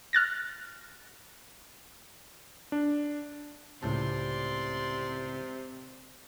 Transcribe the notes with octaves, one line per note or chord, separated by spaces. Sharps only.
F6 F#6 A6 A#6
D4
C#2 A2 C3 D5 A5 C6